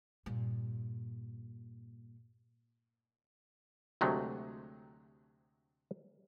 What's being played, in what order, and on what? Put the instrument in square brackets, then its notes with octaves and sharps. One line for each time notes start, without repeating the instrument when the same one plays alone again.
[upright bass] G2 A#2
[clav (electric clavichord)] D2 C3 F#3 G#3 A3